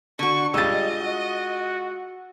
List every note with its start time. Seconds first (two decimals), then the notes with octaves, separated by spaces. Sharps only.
0.19 D3 F#4 C#6
0.54 G3 G#3 F4 D#5 E6 A6
1.01 F#4